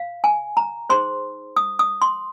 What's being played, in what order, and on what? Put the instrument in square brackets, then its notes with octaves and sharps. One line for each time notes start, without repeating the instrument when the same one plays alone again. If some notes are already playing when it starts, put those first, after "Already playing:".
Already playing: [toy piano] F5
G#5
A#5
D#4 G#4 C5 C6
D#6
D#6
C6